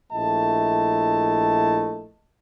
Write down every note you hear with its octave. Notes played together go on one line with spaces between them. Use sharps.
A#1 A3 E4 D#5 A5